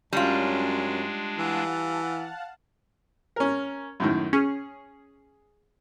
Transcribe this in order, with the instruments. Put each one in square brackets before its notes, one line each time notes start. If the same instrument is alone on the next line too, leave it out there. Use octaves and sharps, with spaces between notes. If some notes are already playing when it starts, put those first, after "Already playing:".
[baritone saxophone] F#2 [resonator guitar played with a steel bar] G3 F4 [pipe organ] G#3 D4 [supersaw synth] C#4
[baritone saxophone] E3 [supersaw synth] F5 F#5 A5
[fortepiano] C#4 A#4
F#2 A2 D#3
[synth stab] C#4 [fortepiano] G#4